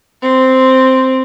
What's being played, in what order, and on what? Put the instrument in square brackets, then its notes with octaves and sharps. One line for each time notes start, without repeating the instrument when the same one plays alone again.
[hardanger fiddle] C4